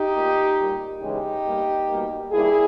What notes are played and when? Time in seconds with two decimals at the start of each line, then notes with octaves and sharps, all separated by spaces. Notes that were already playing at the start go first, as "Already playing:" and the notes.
Already playing: D#4 G4
0.13 A#2 A#3
0.57 A#2 G3 A#3
1.00 E2 C#3 E3 G#3 D#4 G4
1.45 G2 G3 A#3
1.88 B2 G3 A#3
2.32 G2 D#3 G3 A#3 E4 G#4